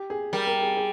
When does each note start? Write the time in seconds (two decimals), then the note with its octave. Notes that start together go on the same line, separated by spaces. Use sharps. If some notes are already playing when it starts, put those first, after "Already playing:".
Already playing: G4
0.10 G#4
0.33 G3 A#4
0.47 A#4
0.62 G#4
0.77 G#4